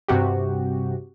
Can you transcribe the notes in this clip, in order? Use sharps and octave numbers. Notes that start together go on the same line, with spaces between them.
G2 C3 F#4 G4